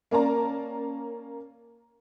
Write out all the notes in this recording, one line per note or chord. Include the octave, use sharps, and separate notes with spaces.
A#3 C#4 A#4 D5 A5 A#5